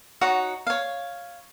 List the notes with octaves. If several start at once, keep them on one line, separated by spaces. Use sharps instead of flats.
D#4 F#4 C#5 F#5
C#5 F5